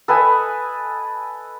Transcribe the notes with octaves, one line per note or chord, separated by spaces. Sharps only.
A4 B4 D#5 G#5